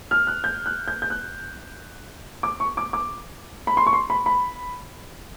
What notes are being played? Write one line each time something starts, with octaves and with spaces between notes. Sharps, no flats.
F6
F#6
G6
F#6
G6
G6
F#6
D6
C#6
D6
D6
B5
C6
C#6
C6
B5
B5